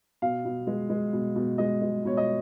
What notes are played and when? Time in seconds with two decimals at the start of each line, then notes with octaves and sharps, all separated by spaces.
0.22 B2 F5
0.45 B2
0.67 G#3
0.90 G#3
1.13 B2
1.36 B2
1.58 G#3 D#5
1.82 G#3
2.05 B2 C#5
2.17 D#5